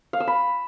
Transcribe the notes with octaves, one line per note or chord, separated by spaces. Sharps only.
F5
E6
B5